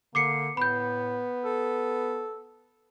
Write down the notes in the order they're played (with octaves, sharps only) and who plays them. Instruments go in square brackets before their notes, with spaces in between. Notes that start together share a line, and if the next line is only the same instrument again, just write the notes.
[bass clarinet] D3 [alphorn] A#3 [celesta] D6 C7 C#7
[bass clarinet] A2 [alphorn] B3 [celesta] B5 G6
[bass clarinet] A4